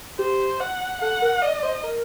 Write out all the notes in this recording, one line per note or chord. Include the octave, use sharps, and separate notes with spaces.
G4 C5
F#5
A4 F#5
A#4
D5 D#5
D5
C5
A#4